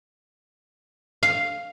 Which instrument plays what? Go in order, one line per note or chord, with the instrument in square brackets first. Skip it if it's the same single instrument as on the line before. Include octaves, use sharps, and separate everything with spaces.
[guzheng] F5